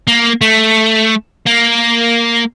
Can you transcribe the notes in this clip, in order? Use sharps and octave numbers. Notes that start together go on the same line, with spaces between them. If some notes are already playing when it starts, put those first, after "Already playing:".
A#3
A3
A#3